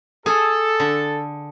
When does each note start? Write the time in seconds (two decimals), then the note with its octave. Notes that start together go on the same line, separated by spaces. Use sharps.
0.26 G#4 A4
0.80 D3